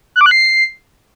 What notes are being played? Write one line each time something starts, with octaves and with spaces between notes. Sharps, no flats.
F#6
D6
F#6
C7